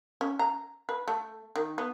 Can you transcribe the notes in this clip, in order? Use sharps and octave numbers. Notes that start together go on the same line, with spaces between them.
C#4
A#5
B4
A3
D#3
B3